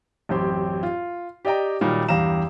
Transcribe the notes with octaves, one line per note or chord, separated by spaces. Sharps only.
A1 F#2 C4 G4 C6
F4
G4 D5 D#5 G5 A#5
A#2 D#3 F#3 G3 A#3 D#4
E2 G2 G4 F5 A#5 E7